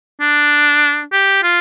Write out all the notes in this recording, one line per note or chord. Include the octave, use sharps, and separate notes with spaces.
D4
G4
F4